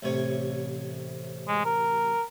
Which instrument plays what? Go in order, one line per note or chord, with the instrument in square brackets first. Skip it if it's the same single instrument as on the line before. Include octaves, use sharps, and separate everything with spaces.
[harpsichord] A1 C3 C#5
[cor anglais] G#3
A#4